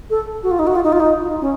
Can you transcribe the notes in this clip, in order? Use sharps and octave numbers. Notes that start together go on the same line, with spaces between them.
A4
F#4
F4
D#4
F#4
F4
D#4
F4
D#4
C#4